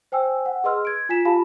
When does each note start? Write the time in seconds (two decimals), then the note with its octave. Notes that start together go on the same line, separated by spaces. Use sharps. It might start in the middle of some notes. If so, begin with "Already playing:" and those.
0.12 C5 G5 G#5 E6
0.46 F#5
0.64 G#4 B4 D#5 C6 E6 F6
0.85 G#6 D7
1.09 F4 G#5 B6 E7
1.25 F4 G4 F5 A5 B5